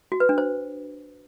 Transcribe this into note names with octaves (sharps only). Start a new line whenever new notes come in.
F#4
B4
D4
C5